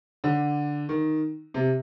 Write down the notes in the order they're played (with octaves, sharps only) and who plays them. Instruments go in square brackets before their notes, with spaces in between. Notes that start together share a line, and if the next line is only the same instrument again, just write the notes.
[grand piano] D3
D#3
C3